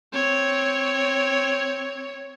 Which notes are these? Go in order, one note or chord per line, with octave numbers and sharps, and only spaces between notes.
C4 C#5